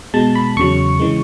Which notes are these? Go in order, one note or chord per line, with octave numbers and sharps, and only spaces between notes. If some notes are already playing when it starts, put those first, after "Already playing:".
B2 G#3 A5
B5
E2 C#3 F#3 C#6
C#3 E3 G#3